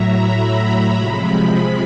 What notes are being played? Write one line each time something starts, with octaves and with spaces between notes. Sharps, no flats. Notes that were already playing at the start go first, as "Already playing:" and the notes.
Already playing: A2 F#3 E5 A#5
B5
C3 F3 G#3